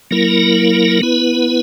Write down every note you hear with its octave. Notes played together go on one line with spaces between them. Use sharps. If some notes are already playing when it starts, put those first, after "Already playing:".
F#3 A#3 E4 A#4
B3 E4 B4